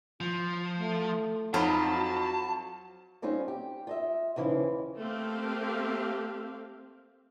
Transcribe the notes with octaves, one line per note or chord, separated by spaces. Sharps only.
F3 F4
A3
F2 F#3 D#4 F4 C5 A5 B5
F#4
G3 C4 C#4 D#4 F4
G4
F4 D#5 E5
D#2 C#3 E3 F3 E4 F5
A3 A#3 C4 G4 F5